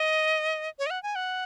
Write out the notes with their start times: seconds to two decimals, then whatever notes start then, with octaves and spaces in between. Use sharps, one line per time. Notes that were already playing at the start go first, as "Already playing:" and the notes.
Already playing: D#5
0.79 C#5
0.86 D#5
0.90 F#5
1.03 G#5
1.15 F#5